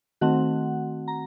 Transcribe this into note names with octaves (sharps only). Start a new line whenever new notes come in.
D#3 A3 C4 F#4 F#5
A#5